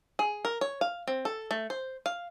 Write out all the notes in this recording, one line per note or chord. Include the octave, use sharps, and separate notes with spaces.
G#4
A#4
C#5
F5
C4
A4
A3
C5
F5